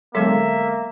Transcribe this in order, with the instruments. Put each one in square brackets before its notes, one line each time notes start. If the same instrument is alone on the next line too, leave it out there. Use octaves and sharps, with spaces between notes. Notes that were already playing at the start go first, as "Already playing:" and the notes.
[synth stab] D3 G#3 A4 [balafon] F#3 B3 [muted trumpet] A#3 [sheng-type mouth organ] E5